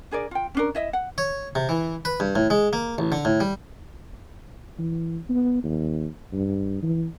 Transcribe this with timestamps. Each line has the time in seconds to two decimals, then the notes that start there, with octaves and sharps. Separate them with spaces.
0.11 D4 G#4 A#4 D5
0.31 F4 G5
0.55 C#4 D4 A#4
0.75 E4 D#5 E5
0.93 F#5
1.18 C#5
1.55 C3
1.69 E3
2.05 B4
2.20 G2
2.35 A2
2.50 G#3
2.73 A#3
2.98 A1
3.12 D3
3.25 A2
3.40 G3
4.79 E3
5.29 B3
5.64 D#2
6.33 G2
6.83 E3